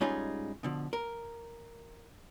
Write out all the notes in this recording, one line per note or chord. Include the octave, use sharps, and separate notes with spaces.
G#2 G3 C#4 D#4 F4 G#4
B2 D3 F3
A#4